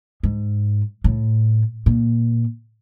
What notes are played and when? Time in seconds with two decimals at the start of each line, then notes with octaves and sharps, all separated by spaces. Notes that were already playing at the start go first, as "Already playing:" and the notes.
0.23 G#2
1.04 A2
1.86 A#2